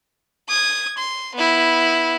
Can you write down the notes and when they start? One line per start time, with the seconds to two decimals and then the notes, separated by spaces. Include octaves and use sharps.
0.49 D#6 G#6
0.98 C6
1.35 B3 E4